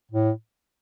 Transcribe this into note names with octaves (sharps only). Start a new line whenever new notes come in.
A2